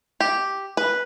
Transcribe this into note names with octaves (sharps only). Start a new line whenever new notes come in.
G4
B4